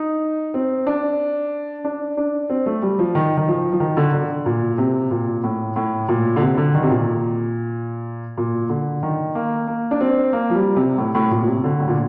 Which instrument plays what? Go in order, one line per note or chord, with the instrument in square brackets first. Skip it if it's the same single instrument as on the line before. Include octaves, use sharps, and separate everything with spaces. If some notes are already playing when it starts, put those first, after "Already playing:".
Already playing: [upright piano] D#4
C4
D4
D4
D4
C4
A3
G3
F3
D#3
D#3
F3
F3
D#3
D3
D3
A#2
C3
A#2
A2
A2
A#2
D3
C3
D3
D#3
C3
A#2
A#2
D3
D#3
A#3
A#3
D4
C4
A#3
F3
G3
C3
A2
A2
A#2
A#2
C3
C3
D3
A2
A#2